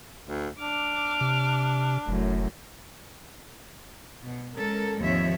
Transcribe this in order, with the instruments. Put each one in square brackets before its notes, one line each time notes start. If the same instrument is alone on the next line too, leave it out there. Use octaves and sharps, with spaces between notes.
[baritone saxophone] D2
[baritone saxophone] D4 [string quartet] D6 F6
[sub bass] C3
[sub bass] F1 [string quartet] F#2 A2
[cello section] B2
G#3 C#4 A4 A#4
D#2 G#2 F3 C4 C#5 E5